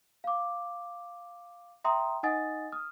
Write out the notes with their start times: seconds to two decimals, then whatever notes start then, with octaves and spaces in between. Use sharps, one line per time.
0.24 F5 D6
1.84 E5 G5 A#5 C6 D#6
2.23 D#4 D#5 F#5 G#5 D#6 A6
2.72 D#6 F6